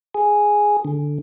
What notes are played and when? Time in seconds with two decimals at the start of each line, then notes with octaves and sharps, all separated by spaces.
0.14 G#4
0.85 D3